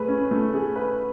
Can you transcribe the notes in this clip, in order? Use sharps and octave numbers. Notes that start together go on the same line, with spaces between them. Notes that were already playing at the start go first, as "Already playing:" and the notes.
Already playing: A3 G#4 B4
C#4
A3
G#4
B4